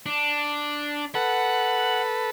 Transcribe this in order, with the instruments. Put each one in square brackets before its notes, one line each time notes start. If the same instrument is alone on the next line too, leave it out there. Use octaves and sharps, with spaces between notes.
[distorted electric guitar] D4
[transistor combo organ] A4 B4 [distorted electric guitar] F#5